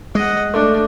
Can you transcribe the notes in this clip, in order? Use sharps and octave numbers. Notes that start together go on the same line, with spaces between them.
G#3 D#5 F#5
A3 D4